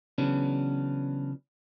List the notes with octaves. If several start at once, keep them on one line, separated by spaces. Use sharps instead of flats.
C#3 E3 F#3 B3 C#4 D4